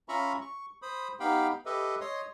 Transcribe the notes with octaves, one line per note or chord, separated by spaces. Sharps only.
C#4 F4 E5 A#5 B5 C#6
C#6
C5 B5 D#6
B3 D#4 G4 F5 G5 B5
G4 A4 B4 D#5 E5
C#5 D#5 C6 D#6